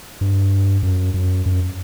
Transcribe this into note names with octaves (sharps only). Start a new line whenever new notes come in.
G2
F#2
F#2
F#2